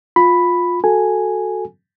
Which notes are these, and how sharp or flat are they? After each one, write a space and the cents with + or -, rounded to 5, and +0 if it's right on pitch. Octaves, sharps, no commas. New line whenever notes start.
F4 +20 B5 +0
F#4 +0 A4 +0 G#5 +0